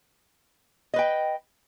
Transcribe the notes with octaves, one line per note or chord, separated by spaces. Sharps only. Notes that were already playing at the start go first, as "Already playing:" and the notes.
B4 D#5 G5